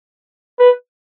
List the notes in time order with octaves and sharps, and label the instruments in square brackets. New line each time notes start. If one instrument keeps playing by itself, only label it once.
[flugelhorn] B4